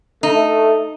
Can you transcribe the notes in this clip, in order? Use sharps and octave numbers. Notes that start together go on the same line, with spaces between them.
A3 D#4